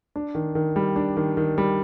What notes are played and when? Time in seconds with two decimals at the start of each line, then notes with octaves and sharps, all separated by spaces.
0.16 D4
0.35 D#3
0.55 D#3
0.76 G3
0.96 D4
1.17 D#3
1.37 D#3
1.58 G3